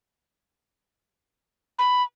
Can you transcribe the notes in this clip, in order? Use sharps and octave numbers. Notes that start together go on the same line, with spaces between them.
B5